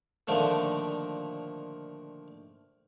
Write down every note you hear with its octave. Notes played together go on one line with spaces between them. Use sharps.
A#2 D3 D#3 F3 A3